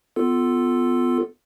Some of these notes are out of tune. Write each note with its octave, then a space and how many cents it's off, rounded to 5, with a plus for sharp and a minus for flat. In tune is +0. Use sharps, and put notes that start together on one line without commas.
B3 +25 F4 +0 A4 +0